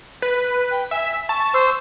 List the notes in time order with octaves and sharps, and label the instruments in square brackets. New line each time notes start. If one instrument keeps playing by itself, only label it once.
[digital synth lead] B4
[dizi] G5
[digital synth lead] E5 [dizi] G#5
[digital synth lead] A5 [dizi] C#6
[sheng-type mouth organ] C5 [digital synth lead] E6